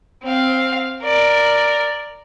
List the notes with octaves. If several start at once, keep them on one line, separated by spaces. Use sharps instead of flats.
C4 F5
A#4 D5